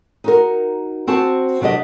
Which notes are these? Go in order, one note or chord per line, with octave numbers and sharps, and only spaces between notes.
D#4 F#4 A#4
C4 F#4 C5 A5
C3 F#3 D4 G4 D#5